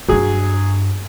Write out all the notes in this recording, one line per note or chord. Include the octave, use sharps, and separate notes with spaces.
G2 F#3 D4 G#4